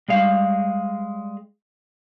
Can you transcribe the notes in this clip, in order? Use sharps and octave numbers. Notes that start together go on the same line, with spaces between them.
G3 G#3 F5